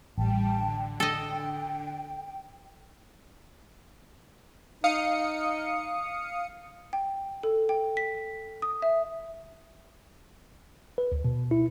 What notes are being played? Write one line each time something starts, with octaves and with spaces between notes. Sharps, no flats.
A1 G3 G5 A5
D3
A4 D#5 G5
D#4 F5 D#6 C#7
G5
A4
G5
B6
D#6
E5
B4
D2
B2
E4